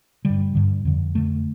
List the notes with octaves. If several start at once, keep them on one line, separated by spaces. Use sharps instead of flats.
G2 D3 G3
G2 D3
F2 D3
F2 D3 A3